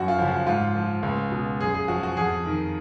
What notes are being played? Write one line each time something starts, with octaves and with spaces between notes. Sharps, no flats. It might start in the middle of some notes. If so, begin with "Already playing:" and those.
Already playing: F#2 F#4
F4
C#3 F3
F#4
G#2 F4
F3
C#2
B2
F#2 G#4
G#4
F3 F#4
F#4
F2 G#4
D#3